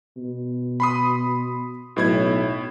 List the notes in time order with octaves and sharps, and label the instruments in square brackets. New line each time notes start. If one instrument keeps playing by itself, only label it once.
[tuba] B2
[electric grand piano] B5 C6 D#6
[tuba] B1 [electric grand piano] A2 E4 G#6